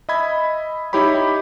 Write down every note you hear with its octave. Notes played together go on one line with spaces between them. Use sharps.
D#5 E5 B5 G#6
D#4 E4 G4 C#5 B5